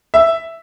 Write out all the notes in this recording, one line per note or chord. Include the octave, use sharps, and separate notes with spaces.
E5